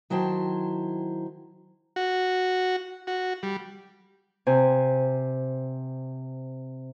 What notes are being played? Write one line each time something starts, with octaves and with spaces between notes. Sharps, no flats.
D#3 F#3 E4 C5 G5 A5
F#4
F#4
G3
C3 G#5